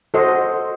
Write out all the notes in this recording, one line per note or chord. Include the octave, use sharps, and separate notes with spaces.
F#4 A4 C5 D#5